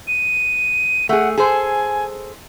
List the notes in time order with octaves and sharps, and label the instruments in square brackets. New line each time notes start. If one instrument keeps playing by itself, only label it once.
[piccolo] D#7
[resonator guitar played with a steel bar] A3 G#4 [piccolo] F#5
[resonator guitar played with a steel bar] G#4 A4 C5 [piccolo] G#5